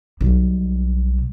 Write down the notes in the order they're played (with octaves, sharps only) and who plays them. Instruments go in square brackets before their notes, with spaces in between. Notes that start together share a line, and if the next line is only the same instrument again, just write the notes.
[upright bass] B1 G3